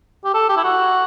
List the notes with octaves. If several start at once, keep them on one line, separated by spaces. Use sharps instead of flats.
G4
A4
G4
E4
F#4